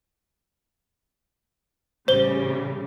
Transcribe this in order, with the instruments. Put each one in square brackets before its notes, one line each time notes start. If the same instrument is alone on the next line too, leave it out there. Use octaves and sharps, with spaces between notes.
[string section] A1 C#3 G3 [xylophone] C5 G7